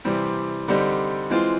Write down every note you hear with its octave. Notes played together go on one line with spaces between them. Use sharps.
C3 E3 G3 C4
D3 G3 C4 D#4 G4
E3 G#3 C4 F4